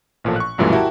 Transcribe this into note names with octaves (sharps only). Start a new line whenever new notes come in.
A1 A#2 F3 A4
C#6 F#6
B1 F#2 A#2 E3 G3 A3
E4 F#4 G4 A#4 G5 A5